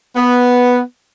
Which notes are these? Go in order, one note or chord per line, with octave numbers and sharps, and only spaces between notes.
B3